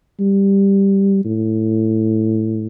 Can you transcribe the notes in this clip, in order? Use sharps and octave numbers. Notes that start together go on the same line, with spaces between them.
G3
A2